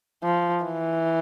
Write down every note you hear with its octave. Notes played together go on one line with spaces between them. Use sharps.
F3
E3